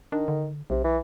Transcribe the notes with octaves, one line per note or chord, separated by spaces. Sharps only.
D#3 D4
D3
B1 C3
E3